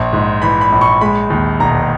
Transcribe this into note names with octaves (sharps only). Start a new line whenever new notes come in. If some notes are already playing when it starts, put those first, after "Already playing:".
Already playing: A#1
G#2
E3 B5
B5
A#1
C#6
G#3 B5
D#2
E1 A#5